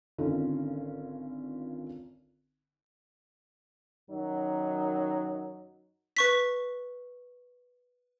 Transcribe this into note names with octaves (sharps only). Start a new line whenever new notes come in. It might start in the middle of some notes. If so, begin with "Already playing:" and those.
G#1 D3 C#4 D#4 F4 A4
F#2 D#3 F#3 D#4
B4 C#6 B6